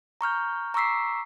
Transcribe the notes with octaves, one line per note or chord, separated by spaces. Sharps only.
A#5 C#6 F6 G6
A#5 C#6 D6 E6 B6 C7